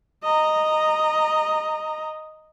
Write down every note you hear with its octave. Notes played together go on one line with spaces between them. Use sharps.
D#5 A#5